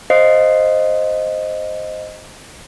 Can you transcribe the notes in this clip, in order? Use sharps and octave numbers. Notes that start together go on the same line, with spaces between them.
C5 D#5 F5 C7